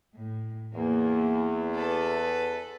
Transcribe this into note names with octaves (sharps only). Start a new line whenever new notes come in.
A2
E2 A#3
A4 B4